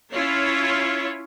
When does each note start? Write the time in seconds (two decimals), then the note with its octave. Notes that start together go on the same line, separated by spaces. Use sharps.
0.13 C#4 E4 F4 C#5